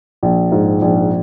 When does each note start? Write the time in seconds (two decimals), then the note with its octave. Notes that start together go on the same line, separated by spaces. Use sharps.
0.23 A#1
0.52 G#2
0.82 A#1